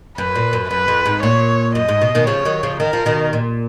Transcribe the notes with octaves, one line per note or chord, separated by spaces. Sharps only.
F#2 B4
A#2
F#2
F#2 B4
F2
G#2
A#2 C#5
F#2 D#5
G#2
B2
B2 D#3
C#3 F3 C#5
D#3 F#3
C#3 F3
D#3 A#4
F3
B2 D#3
A#2